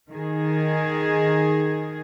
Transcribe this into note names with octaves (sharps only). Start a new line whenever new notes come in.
D#3 G#4